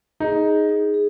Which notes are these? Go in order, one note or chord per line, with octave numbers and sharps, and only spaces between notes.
D#4 G#4
G#4
D#4
G#4